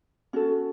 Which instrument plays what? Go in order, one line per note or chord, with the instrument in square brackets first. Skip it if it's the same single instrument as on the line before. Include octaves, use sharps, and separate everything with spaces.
[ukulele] C#4 F#4 A4